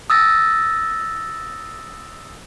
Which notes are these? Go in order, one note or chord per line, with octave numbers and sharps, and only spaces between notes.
D#6 E6 A6 A#6